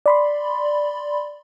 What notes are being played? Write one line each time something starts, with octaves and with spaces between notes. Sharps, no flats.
D5 B5 C6